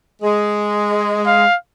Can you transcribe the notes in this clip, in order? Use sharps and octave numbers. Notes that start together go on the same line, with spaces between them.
G#3
F5